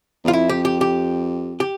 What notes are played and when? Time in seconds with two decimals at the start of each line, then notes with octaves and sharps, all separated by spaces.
0.24 E2
0.28 F4
0.33 F2 E4
0.49 G4
0.65 G4
0.81 G4
1.60 G4